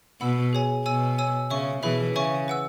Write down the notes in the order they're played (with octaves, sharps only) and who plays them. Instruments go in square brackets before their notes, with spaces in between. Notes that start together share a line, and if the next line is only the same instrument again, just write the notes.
[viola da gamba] B2 [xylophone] F#5 B5 E6
[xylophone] G#4 C#5 G#5
[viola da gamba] B2 [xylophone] C#5 G#5 E6
[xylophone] C#5 G#5 E6
[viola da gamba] C#3 [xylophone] C#5 E5 C#6
[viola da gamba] B2 E3 [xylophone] G#4 B4 E5 B5
[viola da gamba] C#3 [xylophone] C#5 E5 G#5 C#6
[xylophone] B4 F#5 E6